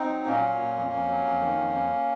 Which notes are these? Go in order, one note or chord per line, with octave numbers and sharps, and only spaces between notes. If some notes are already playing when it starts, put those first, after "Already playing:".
Already playing: C4 D#4
F#3
A#2 A#3 C#4
F#3
A#2
F2
F2
F#3
F2
D#3
F2
F#2